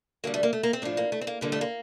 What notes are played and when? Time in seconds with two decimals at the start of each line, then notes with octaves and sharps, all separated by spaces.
0.24 D2 D3 G3 A#3
0.34 A3
0.43 A#3
0.53 A3
0.63 A#3
0.73 C4
0.82 A2 F3 D4
0.97 A#3
1.12 A3
1.21 C4
1.27 A#3
1.41 F2 D3 G3 A#3
1.52 A3
1.61 A#3